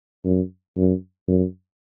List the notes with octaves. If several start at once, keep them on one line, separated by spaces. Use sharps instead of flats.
F#2
F#2
F#2